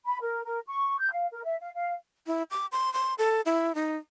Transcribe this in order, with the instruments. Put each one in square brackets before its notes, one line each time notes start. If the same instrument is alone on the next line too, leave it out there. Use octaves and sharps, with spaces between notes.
[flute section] B5
A#4
A#4
C#6
G6
F5
A#4
E5
F5
F5
[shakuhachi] E4
D6
C6
C6
A4
E4
D#4